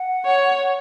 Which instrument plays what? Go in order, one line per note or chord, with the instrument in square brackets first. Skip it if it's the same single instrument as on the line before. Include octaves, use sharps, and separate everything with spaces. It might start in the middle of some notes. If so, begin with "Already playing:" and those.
Already playing: [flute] F#5
[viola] C#5